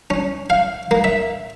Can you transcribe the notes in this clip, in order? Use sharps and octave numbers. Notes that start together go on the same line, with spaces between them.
C#4
F5
A#3
E5